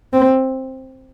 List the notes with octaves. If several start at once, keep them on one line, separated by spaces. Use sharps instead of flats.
C4